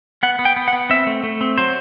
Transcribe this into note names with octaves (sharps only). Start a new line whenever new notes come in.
B3 F#5
B3
G5
B3
F#5
B3
C4 E5
A3
A3
C4
F#3 C5